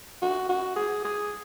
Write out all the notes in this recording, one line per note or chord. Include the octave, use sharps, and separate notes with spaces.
F#4
F#4
G#4
G#4